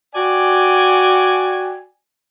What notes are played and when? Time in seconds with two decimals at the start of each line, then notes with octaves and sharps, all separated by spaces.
0.15 F#4 D5 G5 G#5